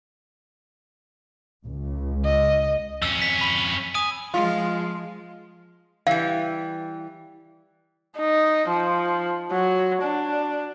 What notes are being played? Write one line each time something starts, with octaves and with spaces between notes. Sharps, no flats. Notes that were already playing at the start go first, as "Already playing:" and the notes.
C#2
D#5
F2 C#4 E6
B6
B5
G#5 D#6
F3 G#3 F4
E3 G3 F5
D#4
F3
F#3
D4